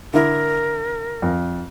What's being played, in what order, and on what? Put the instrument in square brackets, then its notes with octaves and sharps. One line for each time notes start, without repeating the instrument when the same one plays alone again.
[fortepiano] D3 E4 [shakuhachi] A#4
[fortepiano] F2